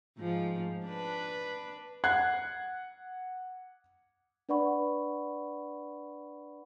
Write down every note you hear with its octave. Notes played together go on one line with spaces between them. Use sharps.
G#2 F3
D4 B4
F#5 F#6 G#6 C7
D4 B4 D5 F#5 B5 C#6